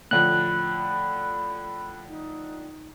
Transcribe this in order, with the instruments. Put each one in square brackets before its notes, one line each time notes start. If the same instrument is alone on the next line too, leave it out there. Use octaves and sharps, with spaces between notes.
[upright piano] A2 D3 F3 [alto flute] B5 [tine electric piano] F#6
[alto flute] D#4